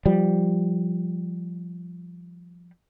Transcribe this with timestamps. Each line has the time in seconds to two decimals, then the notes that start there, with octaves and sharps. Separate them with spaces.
0.06 F3 G3